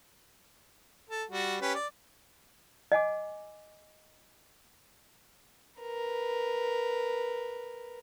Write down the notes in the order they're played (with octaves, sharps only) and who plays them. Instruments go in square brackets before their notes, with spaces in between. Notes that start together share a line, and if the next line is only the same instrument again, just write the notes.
[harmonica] A4
G3 F#4
C#4 G4 B4
D5
[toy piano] D#5 F#5 G#5 D6
[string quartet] A#4 B4